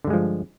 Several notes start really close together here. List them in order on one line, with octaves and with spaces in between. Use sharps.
D3 G2 G#3 F3